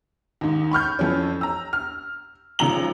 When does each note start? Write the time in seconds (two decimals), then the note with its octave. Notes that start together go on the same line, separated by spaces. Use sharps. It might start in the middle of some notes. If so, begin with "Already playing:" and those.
0.41 D#2 G#2
0.71 B5 C#6 F6 G6
0.99 F2 E3 C#4
1.41 A#5 E6
1.73 F6
2.59 G#1 C#3 F3 A#5 F#7